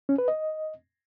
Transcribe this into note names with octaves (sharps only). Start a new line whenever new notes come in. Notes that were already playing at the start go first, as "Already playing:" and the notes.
C#4
B4
D#5